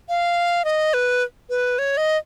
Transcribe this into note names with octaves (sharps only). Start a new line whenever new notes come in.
F5
D#5
B4
B4
C#5
D#5